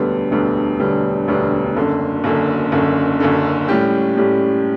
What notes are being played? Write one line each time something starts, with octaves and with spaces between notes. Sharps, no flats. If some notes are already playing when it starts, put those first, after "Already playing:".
Already playing: E1 D2 D3 G3 B3
E1 D2 D3 G3 B3
E1 D2 D3 G3 B3
E1 D2 D3 G3 B3
F#1 F#2 D3
F#1 F#2 D3
F#1 F#2 D3
F#1 F#2 D3
A2 G3 C#4 G4
A2 G3 C#4 G4